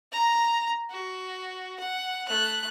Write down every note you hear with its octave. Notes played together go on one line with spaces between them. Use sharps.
A#5
F#4
F#5
A3 F#6